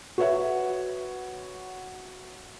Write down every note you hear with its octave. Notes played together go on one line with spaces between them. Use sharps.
F#4 B4 C#5 E5 F#5